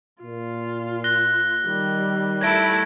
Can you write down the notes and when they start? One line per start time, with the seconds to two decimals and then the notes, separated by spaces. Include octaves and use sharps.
0.23 A#2 F4
1.04 F#6 A#6 G7
1.66 D#3 G3
2.41 A3 E4 G#6 A#6 D7